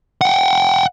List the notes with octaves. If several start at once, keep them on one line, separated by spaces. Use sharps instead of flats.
F#5 G5